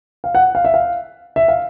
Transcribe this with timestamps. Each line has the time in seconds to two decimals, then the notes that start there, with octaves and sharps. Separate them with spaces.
0.24 F5
0.35 F#5
0.55 F5
0.65 E5
0.74 F5
1.36 E5
1.48 F5